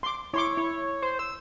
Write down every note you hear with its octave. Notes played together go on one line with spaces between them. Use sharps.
C6 D6
E4 C#5 C6 D6
E4 C#5
C5
E6